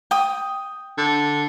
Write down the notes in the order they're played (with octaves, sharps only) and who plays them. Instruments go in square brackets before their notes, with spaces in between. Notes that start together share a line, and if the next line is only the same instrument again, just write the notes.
[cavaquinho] G5 D#6
[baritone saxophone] D3